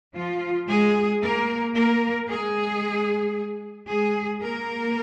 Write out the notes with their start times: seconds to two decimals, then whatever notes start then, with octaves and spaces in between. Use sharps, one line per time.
0.15 F3 F4
0.69 G#3 G#4
1.23 A#3 A#4
1.75 A#3 A#4
2.29 G#3 G#4
3.89 G#3 G#4
4.42 A#3 A#4